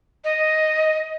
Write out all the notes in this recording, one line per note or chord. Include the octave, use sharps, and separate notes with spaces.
D#5